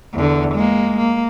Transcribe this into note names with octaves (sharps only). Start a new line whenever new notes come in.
E2 D3
G#3 A#3
A#3